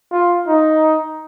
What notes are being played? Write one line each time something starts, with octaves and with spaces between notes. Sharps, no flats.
F4
D#4